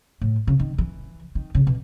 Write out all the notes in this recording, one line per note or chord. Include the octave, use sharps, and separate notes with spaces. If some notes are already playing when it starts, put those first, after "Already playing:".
A2
C#3
D#3
E3
D#3
C#3
B2